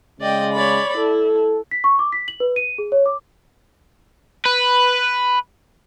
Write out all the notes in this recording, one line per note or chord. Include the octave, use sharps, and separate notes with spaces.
C#3 G#3 D5 D#5 G5
C#5 D5 B5
E4 A4
B6
C#6
D6
B6
F#7
B4
D#7
G#4
C#5
D6
B4